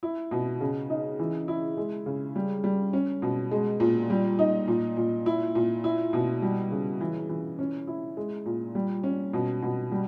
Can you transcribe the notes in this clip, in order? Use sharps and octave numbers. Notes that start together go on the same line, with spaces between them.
E4
B2
C#3
D#4
E3
E4
G#3
C#3
G3
G3
C#4
B2
G#3
A#2
G3
D#4
A#2
A#2
E4
A#2
E4
B2
G3
C#3
E3
E3
C#4
E4
G#3
A#2
G3
C#4
B2
B2
G3